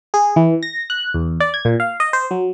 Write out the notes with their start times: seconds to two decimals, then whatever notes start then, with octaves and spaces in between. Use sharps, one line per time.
0.14 G#4
0.36 E3
0.63 A#6
0.90 F#6
1.14 E2
1.40 D5
1.54 G#6
1.65 A#2
1.80 F5
2.00 D#5
2.13 C5
2.31 F#3